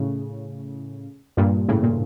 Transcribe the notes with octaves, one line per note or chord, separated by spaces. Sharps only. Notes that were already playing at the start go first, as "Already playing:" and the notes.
Already playing: A2 C#3
G2 A#2
A2 C#3
A#2